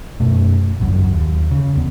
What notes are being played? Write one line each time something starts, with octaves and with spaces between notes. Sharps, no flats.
F#2 B2 A3
G#1 C#2 F#2 F#3
D#2
C#3
E2 B3